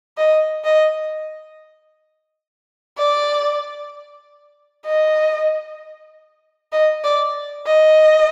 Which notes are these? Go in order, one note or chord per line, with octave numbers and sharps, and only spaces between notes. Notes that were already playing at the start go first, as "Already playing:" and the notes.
D#5
D#5
D5
D#5
D#5
D5
D#5